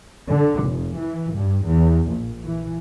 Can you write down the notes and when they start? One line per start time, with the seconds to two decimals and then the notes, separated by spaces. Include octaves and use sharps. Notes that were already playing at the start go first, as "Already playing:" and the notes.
0.29 D3
0.63 F1
0.98 E3
1.35 G2
1.67 E2
2.08 A#1
2.43 E3